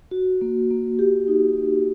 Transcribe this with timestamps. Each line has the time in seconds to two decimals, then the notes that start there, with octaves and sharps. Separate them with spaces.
0.11 F#4
0.41 A#3
0.71 A#3
0.99 A#3 G4
1.28 D#4
1.57 A#3